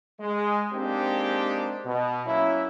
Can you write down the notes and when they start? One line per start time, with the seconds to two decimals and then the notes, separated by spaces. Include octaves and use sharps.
0.20 G#3
0.73 G#3 A#3 C4 D4 D#4 G4
1.85 B2
2.26 F#3 A#3 C#4 E4